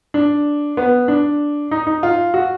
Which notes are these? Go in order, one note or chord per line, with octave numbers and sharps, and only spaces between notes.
D4
B3
D4
D#4
D#4
F4
F#4